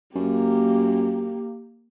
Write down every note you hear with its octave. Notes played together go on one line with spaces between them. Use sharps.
F#2 A#3 G4